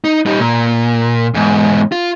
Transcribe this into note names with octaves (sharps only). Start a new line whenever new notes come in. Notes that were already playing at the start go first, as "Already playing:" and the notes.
D#4
G3 D#4
A#2
E2 G#2
F4